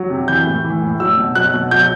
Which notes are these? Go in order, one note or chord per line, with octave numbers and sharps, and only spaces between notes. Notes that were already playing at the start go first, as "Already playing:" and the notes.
Already playing: F#3
C3
E3 G6
A2
E3
A2
F#3 E6
B2
F#3 F#6
B2
F#3 G6